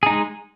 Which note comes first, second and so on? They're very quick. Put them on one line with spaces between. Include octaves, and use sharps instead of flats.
G#4 D#4 G#3